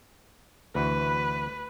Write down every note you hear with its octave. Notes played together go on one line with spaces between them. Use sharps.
D2 E3 F#4 B4